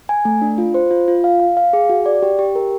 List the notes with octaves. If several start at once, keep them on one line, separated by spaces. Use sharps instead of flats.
G#5
A3
D4
F4
C5
F4
F4
F5
F5
F5
G#4
F#4
D5
G4
G4
A#4